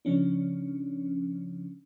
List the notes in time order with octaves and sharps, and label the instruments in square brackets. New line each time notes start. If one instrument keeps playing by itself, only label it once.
[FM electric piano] C#3 F3 C#4 D4